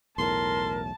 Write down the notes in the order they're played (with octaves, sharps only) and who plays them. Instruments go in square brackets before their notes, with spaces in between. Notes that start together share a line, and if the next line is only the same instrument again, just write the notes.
[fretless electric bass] B1 E2 A2 [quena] A#4 [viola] A5 [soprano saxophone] C6